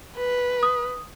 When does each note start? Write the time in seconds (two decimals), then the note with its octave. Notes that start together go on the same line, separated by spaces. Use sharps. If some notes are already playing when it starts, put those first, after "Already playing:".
0.16 B4
0.63 D#6